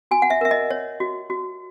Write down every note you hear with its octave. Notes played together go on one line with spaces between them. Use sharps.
F#4 G#5
F#5
E5
A#4 E5
D#5
C#5
F#4
F#4